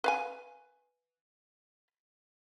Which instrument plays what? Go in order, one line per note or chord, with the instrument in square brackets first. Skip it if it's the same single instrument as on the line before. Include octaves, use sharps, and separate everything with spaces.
[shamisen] B4 F5 G#5